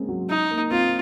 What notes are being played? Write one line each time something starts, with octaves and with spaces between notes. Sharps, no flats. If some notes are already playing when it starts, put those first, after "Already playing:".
Already playing: G#3 A#3 C4 C#4
F#3
D#4
A#3
C4 F4